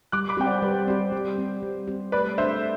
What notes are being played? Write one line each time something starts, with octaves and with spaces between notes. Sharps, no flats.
G3 D6 F#6
B5 D6
C4 G4 G5
D5 F#5
G3 B4 D5
C4 G4 C5
G3
C4 G4
G3
C4 G4
A3 B4 D5
D4 A4 C5 E5